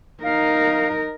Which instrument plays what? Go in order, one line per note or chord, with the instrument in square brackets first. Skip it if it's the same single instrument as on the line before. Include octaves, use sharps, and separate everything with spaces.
[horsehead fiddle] D#4 [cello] A#4 [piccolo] F5